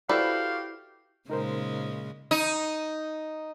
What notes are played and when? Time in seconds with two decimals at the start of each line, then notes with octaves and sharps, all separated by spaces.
0.09 E4 F#4 G4 A4 B4 C5 D5 F5
1.30 A#2 C#3 G#3 D#4 A#4 C5
2.31 D#4